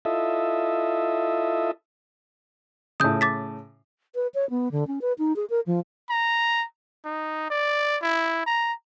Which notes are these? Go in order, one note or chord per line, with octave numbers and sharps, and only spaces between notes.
E4 F4 A4 D#5 E5
A2 C#3 D#6 G6
D6 A6 B6
B4
C#5
B3
D3
C#4
B4
D#4
G#4
A#4
F3
A#5
D#4
D5
E4
A#5